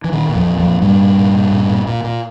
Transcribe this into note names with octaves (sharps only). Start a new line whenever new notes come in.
E3
A#2 D#3
A#2
F2 F3
A#2
F2 F3
A#2
G2 A#2 G3
A#2
A#2
A#2
A#2
A#2
A#2
A#2